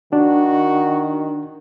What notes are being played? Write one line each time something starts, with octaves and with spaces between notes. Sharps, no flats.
D#3 D4 F#4